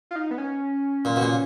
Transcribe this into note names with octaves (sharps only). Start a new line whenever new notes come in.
F4
D#4
B3
C#4
A#2
B2
A#2